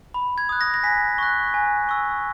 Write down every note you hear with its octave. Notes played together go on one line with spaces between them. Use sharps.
B5
G#6
D#6 F#6
A#6
A#6
G#5 B6
C#6 F#6
G#5
C#6 E6